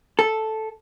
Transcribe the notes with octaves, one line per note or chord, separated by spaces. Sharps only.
A4